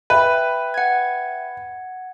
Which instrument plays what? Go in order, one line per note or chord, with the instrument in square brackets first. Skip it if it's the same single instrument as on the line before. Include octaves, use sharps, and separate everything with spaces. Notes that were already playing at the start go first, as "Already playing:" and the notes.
[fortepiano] B4 [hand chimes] E5 G5
[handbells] F#5 G#6